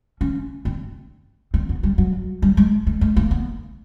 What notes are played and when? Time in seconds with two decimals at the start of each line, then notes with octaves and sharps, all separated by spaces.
0.21 C#4
0.65 C4
1.54 C4
1.69 B3
1.83 G3
1.98 F#3
2.42 G3
2.57 G#3
2.87 A3
3.01 A3
3.16 A#3
3.31 B3